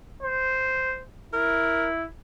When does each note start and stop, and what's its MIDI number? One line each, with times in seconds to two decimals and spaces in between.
0.23 0.98 72
1.33 2.05 64
1.33 1.87 70